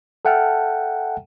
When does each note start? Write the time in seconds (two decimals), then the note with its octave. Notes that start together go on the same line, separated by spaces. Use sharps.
0.25 A4 E5 F#5 G5 A5 F6